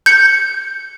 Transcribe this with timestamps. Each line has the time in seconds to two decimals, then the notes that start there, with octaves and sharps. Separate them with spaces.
0.06 G6 C#7